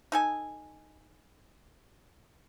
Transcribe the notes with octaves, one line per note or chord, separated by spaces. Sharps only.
D#4 A4 G#5